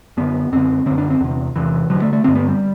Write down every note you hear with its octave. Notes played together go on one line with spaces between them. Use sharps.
F#2 D3 B3
F#2 D3 C4
F#2 D3 C4
D4
C4
E2 C3
E2 C3 E3
G2 D3 F#3
A3
A3
G2 D3 C4
B3
G3